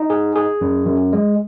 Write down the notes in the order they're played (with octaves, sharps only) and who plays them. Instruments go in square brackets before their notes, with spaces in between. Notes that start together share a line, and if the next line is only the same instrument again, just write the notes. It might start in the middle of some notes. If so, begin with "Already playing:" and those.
Already playing: [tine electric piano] D#4
G#4
G#4
F#2
F#2
G#3